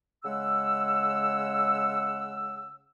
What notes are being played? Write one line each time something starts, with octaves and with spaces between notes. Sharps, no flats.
C#3 G#3 F#5 E6